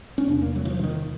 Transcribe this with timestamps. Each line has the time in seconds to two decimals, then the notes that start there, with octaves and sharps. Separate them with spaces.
0.18 C#4
0.27 E2 C3 D4
0.42 A#3
0.56 F#3
0.65 E3
0.70 F3
0.79 E3
0.84 D#3